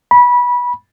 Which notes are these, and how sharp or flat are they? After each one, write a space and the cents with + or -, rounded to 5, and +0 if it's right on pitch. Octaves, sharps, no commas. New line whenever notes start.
B5 -20